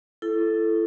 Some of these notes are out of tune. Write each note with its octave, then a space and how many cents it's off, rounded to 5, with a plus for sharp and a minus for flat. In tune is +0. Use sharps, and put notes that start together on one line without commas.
E4 +30 A4 -5